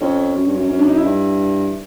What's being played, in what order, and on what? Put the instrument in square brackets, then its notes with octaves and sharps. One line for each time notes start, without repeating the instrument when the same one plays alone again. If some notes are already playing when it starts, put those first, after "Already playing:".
[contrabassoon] F2 [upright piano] C#4
[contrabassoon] F#2
G2
F#2
[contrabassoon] F#2 [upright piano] C#4
[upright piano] D4
D#4
E4
[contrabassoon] G2